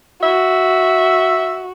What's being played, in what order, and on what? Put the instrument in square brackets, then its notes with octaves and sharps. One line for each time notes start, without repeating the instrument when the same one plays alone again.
[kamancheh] F#4 [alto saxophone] E5